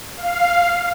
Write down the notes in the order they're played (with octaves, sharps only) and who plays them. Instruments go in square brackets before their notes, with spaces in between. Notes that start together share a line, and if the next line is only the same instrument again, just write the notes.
[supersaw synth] F5